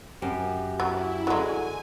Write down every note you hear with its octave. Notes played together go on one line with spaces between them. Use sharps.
F#2 G4
F#3 E4
D3 F#3 G#3 G#5